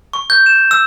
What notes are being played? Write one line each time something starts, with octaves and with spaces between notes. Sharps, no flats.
C#6
G6
E7
E6